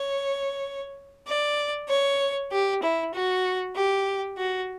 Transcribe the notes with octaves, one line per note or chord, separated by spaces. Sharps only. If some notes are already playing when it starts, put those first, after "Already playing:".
Already playing: C#5
D5
C#5
G4
E4
F#4
G4
F#4